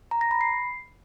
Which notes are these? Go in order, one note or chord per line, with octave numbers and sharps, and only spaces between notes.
A#5
A#6
B5
C7